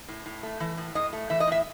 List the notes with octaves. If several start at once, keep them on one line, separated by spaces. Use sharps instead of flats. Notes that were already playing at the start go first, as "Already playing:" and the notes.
A2
A2
A3
E3
A2
A2 D#5
A3
E3 E5
D#5
A2 E5